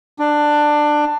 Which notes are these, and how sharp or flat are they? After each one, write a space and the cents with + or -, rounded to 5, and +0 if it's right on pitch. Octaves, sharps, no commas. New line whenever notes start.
D4 +15